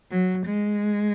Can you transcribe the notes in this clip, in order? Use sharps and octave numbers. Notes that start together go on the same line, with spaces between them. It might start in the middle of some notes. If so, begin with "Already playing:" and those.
F#3
G#3